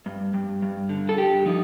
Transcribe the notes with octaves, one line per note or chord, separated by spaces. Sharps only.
G2
G2
G2
D3
A4
G2 G4
F3 D#4